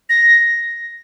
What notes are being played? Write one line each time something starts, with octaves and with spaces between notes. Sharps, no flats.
A#6